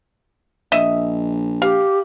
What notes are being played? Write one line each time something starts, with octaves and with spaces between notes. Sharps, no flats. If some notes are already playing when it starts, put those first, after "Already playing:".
A#1 D#5 E5
G4 F5